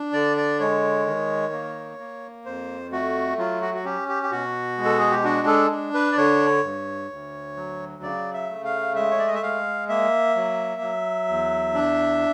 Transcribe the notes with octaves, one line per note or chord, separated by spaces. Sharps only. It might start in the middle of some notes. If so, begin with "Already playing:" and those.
Already playing: D4
D3 D5
D5
G#3 C#5
D#3
A#3
A#3
F2 C5
A3 F#4
F#3 F4
F#4
F#4
C#4 G4
G4
G4
B2 F#4
G#3
A4
G#4
G4
D4 F#4
A4
D4
B4
D5
D3 C#5
G2
D2
F#3
C#3 D5
E5
A3
F5
G#3 E5
C#5
D5
D#5
E5
G#3 F5
A#3 E5
F#3
F#3
E2
D4